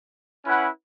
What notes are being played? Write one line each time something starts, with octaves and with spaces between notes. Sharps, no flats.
C#4 E4 B4 F#5